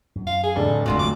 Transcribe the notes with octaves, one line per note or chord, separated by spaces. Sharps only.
F#2
F5
G#4
F1 A2 D3 F#3 D4 A4
D#1 G#1 D2 F4 F#4 D5
F#3 D6